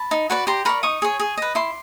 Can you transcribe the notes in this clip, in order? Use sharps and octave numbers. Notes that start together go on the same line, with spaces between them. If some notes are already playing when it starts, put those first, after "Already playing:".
Already playing: A5 B5
D#4
F#4 B4 D5
G4 A#5 C6
A#4 D5 B5 C#6
D#4 C#6 D#6
G#4 C#5
G#4
B4 D#5
E4 C6 D6